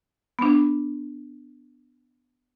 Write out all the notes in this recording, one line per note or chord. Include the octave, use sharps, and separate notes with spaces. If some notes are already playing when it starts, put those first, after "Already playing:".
B3 D4